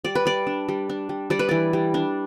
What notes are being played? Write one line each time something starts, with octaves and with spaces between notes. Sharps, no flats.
G3 D5
B4
G3 D5
D4
G3
D4
G3
G3 D5
B4
E3 D5
G3
D4